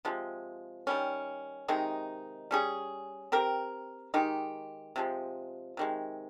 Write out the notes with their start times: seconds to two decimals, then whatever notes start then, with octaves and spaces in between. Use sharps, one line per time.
0.05 C3 F3 G#3
0.87 D#3 G3 C#4
1.68 C3 D#3 G#3 D#4
2.51 G3 C#4 G#4
3.32 C4 G4 A#4
4.14 D#3 G#3 D#4 G4
4.96 C3 F3 G#3
5.77 C3 D#3 G#3